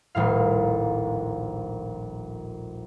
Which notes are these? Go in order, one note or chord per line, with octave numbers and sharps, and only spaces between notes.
D#1 A#1 A2 F5